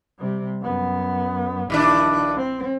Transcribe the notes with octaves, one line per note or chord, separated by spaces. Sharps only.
C3 G3
F#2 B3
A#1 G2 D#3 D4 E4
C4